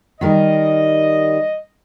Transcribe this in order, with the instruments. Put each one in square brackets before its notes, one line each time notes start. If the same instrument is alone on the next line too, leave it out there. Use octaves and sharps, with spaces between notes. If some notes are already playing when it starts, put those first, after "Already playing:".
[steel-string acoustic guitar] D#3 G3 A#4 [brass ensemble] D#5